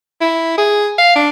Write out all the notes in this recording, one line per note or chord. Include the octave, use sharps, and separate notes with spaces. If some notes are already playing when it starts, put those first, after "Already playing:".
E4
G#4
F5
D4